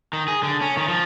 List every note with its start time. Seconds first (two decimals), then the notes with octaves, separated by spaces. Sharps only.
0.13 D#3
0.28 G#4
0.43 D3
0.61 C#4
0.77 D#3
0.88 F3